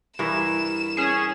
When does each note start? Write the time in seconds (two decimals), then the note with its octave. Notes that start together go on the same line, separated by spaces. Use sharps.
0.19 G2 E3 A#4 E7
0.97 C#4 G#4